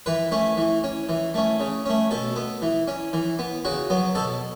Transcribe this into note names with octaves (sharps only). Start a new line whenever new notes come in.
E3 B4
A3 C#4
E3
C#4
E3
A3 C#4
C#3
A3 C#4
B2 A4
B3
E3
C#4
E3
B3
C#3 F#4
F#3 B3
B2 A4